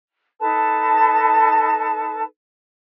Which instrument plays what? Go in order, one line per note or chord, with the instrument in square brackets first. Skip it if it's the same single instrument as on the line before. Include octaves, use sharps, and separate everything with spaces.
[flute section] D#4 A4 B4 A5